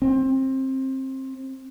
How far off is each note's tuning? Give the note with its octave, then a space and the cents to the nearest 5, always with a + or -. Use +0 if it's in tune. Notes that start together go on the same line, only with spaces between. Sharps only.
C4 +25